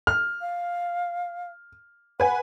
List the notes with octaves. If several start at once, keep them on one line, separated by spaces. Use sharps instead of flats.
F6
F5
B4 F#5 G#5